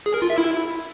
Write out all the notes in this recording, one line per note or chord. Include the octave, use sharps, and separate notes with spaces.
G#4
A#4
F4
E5
E4